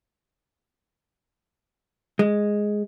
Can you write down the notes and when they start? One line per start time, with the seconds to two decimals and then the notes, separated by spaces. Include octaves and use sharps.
2.19 G#3